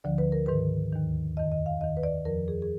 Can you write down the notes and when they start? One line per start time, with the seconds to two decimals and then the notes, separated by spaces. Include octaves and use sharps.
0.04 D2 D3 F3 D5
0.18 B4
0.32 A#4
0.46 G#2 D#3 B4
0.93 D#2 D#3
1.37 F2 D#3 D#5
1.52 D#5
1.66 F5
1.81 D#2 D#3 D#5
1.97 B4
2.03 D5
2.25 F2 F3 A#4
2.48 G#4
2.62 G#4